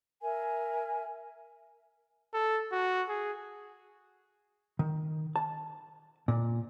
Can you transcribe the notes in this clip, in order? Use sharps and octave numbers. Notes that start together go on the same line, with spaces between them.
A#4 E5 G#5
A4
F#4
G#4
D#3
A5
A#2